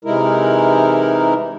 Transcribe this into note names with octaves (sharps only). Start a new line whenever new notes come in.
C3 E3 G#3 D#4 E4 A#4